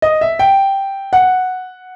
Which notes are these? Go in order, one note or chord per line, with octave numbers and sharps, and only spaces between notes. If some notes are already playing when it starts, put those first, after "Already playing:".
D#5
E5
G5
F#5